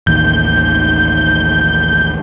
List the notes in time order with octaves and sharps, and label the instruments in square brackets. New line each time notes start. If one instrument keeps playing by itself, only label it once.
[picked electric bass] A1 D#2 D#3 [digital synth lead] G6